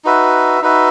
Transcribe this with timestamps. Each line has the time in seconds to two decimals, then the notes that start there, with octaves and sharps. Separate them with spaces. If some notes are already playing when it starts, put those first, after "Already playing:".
0.04 D#4 F#4 B4 E5
0.62 D#4 F#4 B4 E5